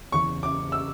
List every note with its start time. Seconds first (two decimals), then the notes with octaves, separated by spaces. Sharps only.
0.12 F#1 E2 C#3 E3 C#6
0.43 D6
0.72 E6